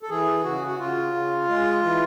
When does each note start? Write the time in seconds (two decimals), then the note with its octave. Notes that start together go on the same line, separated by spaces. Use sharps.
0.03 A4
0.10 E3 G#4
0.44 C#3 F#4
0.67 F#4
0.79 C#3 F4
1.14 C#3
1.49 G#3
1.83 E3